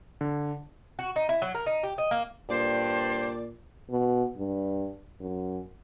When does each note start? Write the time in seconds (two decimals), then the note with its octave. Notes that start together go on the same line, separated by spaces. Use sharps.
0.21 D3
0.99 F#4
1.16 D#4
1.29 E4
1.42 F#3
1.55 A#4
1.66 D#4
1.83 G4
1.98 D#5
2.11 A#3
2.50 G2 A#2 C5 D5
3.90 B2
4.37 G2
5.21 F#2